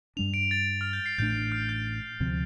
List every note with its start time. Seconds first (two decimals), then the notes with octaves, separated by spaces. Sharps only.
0.17 G2 G3 D4 F7
0.34 D7
0.51 A6
0.81 F6
0.93 G6
1.06 C7
1.18 A1 A2 A3 D4 G6
1.52 F6
1.69 G6
2.20 D2 C3 F3 C4